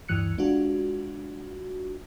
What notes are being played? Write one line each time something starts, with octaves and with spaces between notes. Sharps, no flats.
D2 G2 E3 F#6 C#7
G#3 D4 F4 F#4